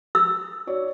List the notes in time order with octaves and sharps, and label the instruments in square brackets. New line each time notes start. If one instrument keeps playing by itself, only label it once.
[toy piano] E6
[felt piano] F#4 C#5 D5